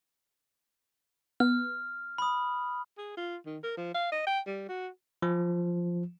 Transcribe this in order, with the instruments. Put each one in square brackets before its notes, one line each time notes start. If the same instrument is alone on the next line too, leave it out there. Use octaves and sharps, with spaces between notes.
[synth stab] B3 [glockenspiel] F6
[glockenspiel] B5 D#6
[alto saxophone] G#4
F4
D#3
A#4
F3
F5
D#5
G5
G3
F#4
[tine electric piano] F3